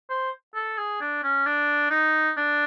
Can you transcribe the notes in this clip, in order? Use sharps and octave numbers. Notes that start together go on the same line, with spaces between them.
C5
A4
G#4
D4
C#4
D4
D#4
D4